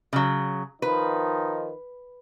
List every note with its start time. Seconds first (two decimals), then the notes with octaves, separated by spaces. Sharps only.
0.13 C#3 F#3
0.82 D#3 F3 D#4 B4